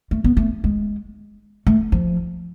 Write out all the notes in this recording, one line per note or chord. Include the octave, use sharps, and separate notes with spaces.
A3
B3
A3
G#3
A3
F3